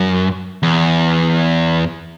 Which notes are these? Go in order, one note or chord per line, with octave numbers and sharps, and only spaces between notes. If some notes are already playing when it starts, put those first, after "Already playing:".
Already playing: F#2
E2